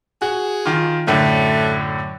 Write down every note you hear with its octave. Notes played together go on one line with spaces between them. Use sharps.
F#4 G#4
D#3 F4
F#2 A2 D3 A3